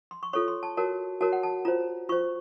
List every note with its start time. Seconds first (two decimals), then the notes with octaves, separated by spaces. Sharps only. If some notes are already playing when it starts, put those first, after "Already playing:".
0.11 C6
0.23 C#6
0.33 F4 A4 C#5 C#6
0.48 C6
0.63 A5
0.77 F#4 A#4 C#5 A5
1.21 F#4 A#4 C#5 A5
1.32 F#5
1.43 A5
1.65 F4 C5 A#5
2.09 F4 C5 C#6